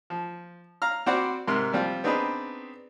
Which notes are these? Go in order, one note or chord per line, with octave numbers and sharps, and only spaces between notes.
F3
F5 A#5 F6
C4 F#4 C5 D5 F#5 B5
G#2 C3 A#4 C6
F3 G3 C4 F4
B3 C4 D4 D#4 G#4 B4